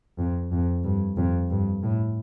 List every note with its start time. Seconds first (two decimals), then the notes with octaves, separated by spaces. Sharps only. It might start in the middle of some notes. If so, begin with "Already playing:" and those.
0.19 F2
0.52 F2
0.84 G2
1.17 F2
1.50 G2
1.83 A2